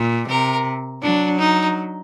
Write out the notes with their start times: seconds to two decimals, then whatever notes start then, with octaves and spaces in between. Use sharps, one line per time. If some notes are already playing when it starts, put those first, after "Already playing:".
Already playing: A#2
0.28 C3 A#4
1.02 F#3 D4
1.39 D#4